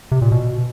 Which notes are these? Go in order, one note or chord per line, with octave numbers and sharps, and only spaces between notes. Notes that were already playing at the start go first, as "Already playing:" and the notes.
C3
A#2
B2